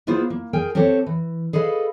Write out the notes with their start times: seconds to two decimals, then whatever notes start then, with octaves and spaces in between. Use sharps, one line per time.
0.07 A#3 B3 E4 F4 G#4 C5
0.30 A#3
0.53 G#4 A#4 G5 G#5
0.75 C4 G4 A4 C5 C#5
1.06 E3
1.53 G#4 A4 B4 D#5 F5